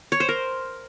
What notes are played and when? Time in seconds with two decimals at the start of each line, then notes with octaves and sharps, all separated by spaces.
0.12 C#5
0.20 C5
0.29 A#4